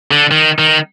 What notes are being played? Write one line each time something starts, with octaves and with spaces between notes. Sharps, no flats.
D3
D#3
D#3